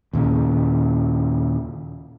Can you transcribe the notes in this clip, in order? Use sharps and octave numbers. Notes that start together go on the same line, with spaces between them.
D#2 A#2 C#3